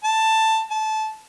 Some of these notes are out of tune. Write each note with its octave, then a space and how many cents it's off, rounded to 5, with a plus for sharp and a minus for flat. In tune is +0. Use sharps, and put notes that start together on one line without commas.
A5 +10
A5 -20